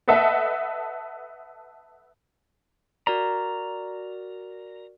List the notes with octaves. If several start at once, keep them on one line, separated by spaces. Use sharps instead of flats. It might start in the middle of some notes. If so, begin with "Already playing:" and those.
A4 B4 D#5 E5 F#5 A5
F#4 A#4 D5 A#5